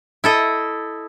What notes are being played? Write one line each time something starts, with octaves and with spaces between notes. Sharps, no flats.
E4 A4 D#5